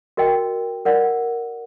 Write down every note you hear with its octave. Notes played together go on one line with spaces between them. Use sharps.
F#4 A#4 D#5 G5
A#4 D5 F#5